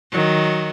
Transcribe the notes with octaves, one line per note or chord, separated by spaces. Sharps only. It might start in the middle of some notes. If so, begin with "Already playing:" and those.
D#3 F#3